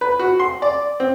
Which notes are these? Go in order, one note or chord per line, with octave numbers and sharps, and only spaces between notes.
B4
F#4
C6
D5
C4